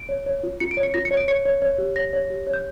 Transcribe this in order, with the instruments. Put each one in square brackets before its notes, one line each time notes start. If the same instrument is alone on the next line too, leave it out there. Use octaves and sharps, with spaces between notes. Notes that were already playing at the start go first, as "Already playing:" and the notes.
Already playing: [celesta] D7
C#5
C#5
F4
F4 C#7
D7
C#5
C#7
F4 A#6
C#7
C#5
D7
C#5 C#7
C#5
C#5
G4
C#5 A#6
C#5
G4
C#5
G6